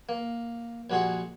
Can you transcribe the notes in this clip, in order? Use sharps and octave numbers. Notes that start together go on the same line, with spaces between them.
A#3
A#1 G3 F#4 G#4 F#5 C6